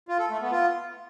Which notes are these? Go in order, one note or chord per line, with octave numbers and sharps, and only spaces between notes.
F4
A4
A3
B3
F4